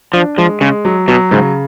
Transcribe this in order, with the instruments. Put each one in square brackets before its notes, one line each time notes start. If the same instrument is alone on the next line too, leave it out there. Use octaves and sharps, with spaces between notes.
[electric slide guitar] F3 [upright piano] D4
[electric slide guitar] F3 [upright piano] G#3
[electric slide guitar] C#3 [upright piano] G#3
[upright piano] F#3
[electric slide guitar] B2 [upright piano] F#3
[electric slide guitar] G#2 [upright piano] C#3